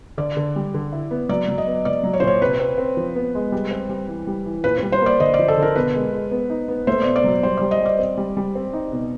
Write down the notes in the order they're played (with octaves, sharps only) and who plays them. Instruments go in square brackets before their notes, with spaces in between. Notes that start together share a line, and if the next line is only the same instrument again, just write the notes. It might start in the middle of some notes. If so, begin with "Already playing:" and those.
[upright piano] D3 [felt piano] D5
[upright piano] D3
G3
D3
E4
B3
[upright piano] F#3 [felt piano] D5
[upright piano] F#3
[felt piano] D#5
[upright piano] B3
[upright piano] F#3 [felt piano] D5
[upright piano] F#3
[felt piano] C#5
[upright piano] A#2 [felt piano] C5
[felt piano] C#5
[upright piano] C3 [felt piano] B4
[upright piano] C4
C4
F3
B3
G#3
G3
C4
G3
E3
G3
E3
[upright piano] A#2 [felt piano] B4
[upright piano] G3 [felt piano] B4
[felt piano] C5
[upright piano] A#3 [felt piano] D5
[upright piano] D3 [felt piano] D#5
[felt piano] D5
[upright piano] F3
[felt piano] A4
[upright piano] D3
[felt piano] A#4
[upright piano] B2 [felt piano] B4
[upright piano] G#3
G#3
B3
D#4
B3
[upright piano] A3 [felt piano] C5
[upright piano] B2 [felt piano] D5
[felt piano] D5
[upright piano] F#3
[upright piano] G3 [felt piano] C5
[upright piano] G3 [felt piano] D5
[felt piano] D#5
[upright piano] G3 [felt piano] D5
[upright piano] C4
G3
G3
C4
D#4
B2